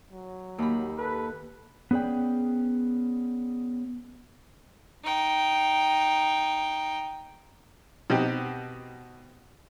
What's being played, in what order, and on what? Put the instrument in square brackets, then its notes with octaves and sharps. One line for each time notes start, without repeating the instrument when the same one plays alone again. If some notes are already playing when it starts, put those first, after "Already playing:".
[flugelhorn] F#3
[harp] D#2 B5 [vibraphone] A#3 G4
[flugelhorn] A4 [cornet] B4
[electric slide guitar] B3 C#4 G#4 D5 G5
[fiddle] D#4 G5
[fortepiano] B2 C4 D#4 G4